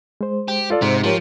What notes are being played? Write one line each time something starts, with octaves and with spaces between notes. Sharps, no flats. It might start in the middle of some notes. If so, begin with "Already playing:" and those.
G#3 C5
G4
F4 A4 D5
G#2 C3 C5
F3 G4 A#4 C#5